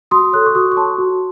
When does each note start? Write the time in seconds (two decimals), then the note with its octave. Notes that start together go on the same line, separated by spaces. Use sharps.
0.11 F#4 C6 D#6
0.33 A4 C#5 D#6 F#6
0.46 C#6
0.55 F#4 C6 D#6
0.72 C#6
0.76 A4 C#5 A5 C6
0.98 F#4